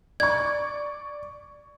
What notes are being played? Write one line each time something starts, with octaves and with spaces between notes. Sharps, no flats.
D5 C#6 G#6